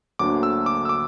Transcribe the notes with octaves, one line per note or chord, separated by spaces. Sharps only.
D2 D3 F#3 A#3 D4 D6
E6
D6
E6
D6